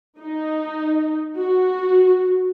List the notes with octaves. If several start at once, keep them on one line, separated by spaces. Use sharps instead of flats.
D#4
F#4